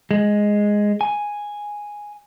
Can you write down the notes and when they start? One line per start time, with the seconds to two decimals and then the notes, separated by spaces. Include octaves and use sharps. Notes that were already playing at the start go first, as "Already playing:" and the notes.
0.11 G#3
1.01 G#5